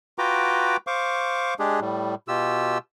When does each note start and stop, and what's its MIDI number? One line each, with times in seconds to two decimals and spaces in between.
0.18 0.77 65
0.18 0.77 66
0.18 0.77 71
0.18 0.77 79
0.18 0.77 82
0.18 0.77 86
0.87 1.54 72
0.87 1.54 77
0.87 1.54 85
0.87 1.54 86
1.59 1.80 56
1.59 1.80 62
1.59 1.80 67
1.59 1.80 68
1.80 2.15 45
1.80 2.15 55
2.28 2.78 47
2.28 2.78 65
2.28 2.78 67
2.28 2.78 88